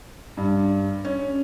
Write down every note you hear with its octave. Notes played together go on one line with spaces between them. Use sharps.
G2
C#4